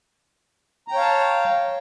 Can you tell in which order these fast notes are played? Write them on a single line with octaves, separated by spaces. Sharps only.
A#5 G5 C#5 F5 A5